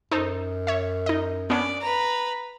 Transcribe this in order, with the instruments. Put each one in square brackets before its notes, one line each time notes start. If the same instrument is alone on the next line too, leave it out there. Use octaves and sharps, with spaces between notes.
[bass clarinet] F#2 [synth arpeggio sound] D#4 A4 C5
[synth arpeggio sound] C#5 E5
D#4 D#5
[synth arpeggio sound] B3 C#4 D4 [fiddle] D5
[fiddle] B4 A#5